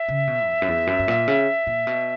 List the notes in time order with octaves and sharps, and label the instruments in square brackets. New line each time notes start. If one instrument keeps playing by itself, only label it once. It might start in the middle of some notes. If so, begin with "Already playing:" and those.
Already playing: [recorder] E5
[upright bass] C#3
B2
E2
F#2
E2
F#2
G2
A#2
C#3
A#2
B2